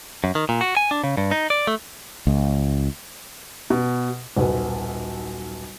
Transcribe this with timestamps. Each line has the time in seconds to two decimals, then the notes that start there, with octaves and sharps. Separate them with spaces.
0.24 F#2
0.35 D#3
0.49 A#2
0.61 F#4
0.77 G#5
0.91 D4
1.04 C#3
1.17 G2
1.31 D#4
1.50 D5
1.67 A3
2.27 C#2
3.70 B2
4.37 D#1 B1 B4